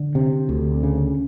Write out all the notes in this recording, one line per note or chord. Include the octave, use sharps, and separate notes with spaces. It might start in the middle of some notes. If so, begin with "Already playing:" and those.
Already playing: D3
C3
D2
C#3